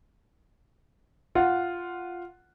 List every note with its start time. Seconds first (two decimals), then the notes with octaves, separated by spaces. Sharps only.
1.35 F4 F#5